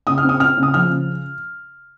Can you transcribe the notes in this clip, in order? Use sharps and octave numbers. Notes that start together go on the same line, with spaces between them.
C#3 D#6
F6
C4 D#6
C4 F6
C#3
D#6
F3 F6
C#3